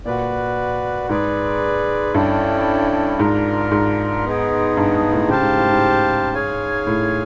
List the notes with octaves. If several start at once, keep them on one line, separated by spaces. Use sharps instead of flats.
A#2 F#4 B4 D5
G#2 G#4 B4 D5
G2 C#4 E4 A4 D5 G5
G#2 D4 F4 A#4
G#2
B3 D#4 G#4
G2
G#2
A2
C#3 G4 C5 F5 A5
G#2
A2
G#2
G#4 C#5 F5 G#5
A2